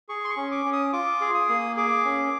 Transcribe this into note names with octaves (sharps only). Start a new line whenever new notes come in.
G#4 C#6
C6
C#6
C#4
D6
C#4
D#6
F4 D6
G#4
D#6
A#3
G#4 D6
C#4